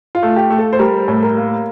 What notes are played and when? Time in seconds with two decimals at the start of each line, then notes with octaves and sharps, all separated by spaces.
0.15 F4
0.23 A3
0.36 G4
0.50 A3
0.58 A4
0.73 C5
0.79 G3 A#4
1.08 A2
1.23 A#4
1.37 A#3